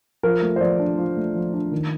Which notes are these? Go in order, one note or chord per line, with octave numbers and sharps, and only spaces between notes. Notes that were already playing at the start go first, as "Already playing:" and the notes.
F3 A#4
A3
C5
F3 D5
D4
F3
A3
F3
D4
D#3